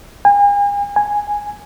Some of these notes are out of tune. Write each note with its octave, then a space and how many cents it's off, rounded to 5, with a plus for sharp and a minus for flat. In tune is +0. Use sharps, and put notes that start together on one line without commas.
G#5 -40
G#5 -5